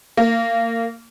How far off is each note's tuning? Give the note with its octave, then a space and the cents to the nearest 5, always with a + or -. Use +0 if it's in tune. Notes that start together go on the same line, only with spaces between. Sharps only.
A#3 -30